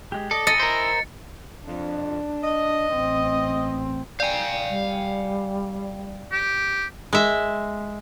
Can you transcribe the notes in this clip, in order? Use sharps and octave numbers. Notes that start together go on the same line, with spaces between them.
G#3 G4
A4 D5 D#5
E4 D#5 G#5 A#5 A6 C#7
A#4 C5
F2 D4
D#5
A1 C4
D5 F5 G5 G#5
G3
G4
G#3 E5